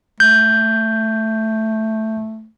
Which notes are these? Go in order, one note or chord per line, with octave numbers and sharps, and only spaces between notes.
A3 G6